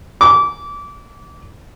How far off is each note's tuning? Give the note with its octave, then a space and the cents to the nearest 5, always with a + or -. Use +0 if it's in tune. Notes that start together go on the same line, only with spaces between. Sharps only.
D6 -25